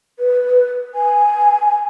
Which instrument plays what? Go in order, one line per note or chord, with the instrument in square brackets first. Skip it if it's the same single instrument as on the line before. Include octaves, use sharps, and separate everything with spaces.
[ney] B4
G#5